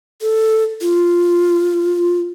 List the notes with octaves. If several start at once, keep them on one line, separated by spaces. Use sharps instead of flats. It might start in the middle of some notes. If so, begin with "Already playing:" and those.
A4
F4